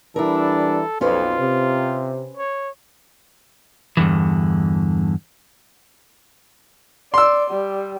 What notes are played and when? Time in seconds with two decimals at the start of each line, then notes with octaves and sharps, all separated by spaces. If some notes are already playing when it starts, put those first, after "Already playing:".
0.16 E3 G3 D4 E4 A4 A#4
1.01 B1 F2 C#4 F4 B4 C5
1.39 C3
2.37 C#5
3.97 E2 G2 A#2 D3 E3
7.14 D5 C6 E6
7.50 G3